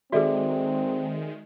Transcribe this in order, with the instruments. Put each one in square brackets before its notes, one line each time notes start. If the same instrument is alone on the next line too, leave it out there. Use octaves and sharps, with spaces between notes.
[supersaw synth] D#3 G#3 [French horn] C4 [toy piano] F#4 G#4 [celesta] A4 D5 E5